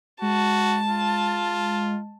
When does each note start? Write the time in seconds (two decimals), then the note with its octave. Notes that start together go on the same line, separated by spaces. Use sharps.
0.22 G#3 F#4 A5
0.88 F4